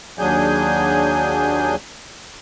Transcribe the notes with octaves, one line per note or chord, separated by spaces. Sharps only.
D#2 F#3 D4 G#4 G#5 G6